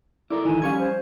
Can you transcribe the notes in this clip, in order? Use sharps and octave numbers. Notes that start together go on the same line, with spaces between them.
E4 A4 A#4 D5 D6
A1 D#3 E3 G#5
F3 G3 C#4 F5 C#6 G#6
C5